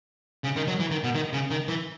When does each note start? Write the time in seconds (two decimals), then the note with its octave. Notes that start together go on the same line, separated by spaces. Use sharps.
0.44 C#3
0.56 D#3
0.68 F#3
0.80 E3
0.91 D#3
1.04 B2
1.15 D#3
1.33 C#3
1.50 D#3
1.68 E3